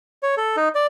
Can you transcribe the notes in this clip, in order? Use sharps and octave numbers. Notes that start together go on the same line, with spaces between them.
C#5
A4
D#4
D5